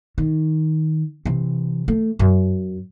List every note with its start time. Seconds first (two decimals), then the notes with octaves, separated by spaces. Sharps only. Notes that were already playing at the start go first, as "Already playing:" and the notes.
0.18 D#3
1.25 C3 E3
1.88 A3
2.19 F#2